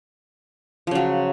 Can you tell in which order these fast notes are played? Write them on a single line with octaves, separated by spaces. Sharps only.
F3 C#3 F#3